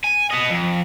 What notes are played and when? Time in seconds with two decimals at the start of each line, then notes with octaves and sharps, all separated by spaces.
0.04 G#5
0.31 B3 D#5
0.51 F2